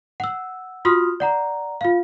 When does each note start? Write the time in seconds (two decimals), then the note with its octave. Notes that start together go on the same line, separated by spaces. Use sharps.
0.20 F#5 E6
0.85 F4 F#4 C6 D#6 F6
1.20 D5 F#5 A#5
1.81 F4 F5